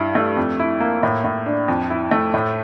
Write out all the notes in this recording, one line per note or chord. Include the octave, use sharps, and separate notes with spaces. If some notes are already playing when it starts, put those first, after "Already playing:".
Already playing: G2 E4
A3
F2
E4
A#3
A2
A2
D4
F2
E4
A3
A2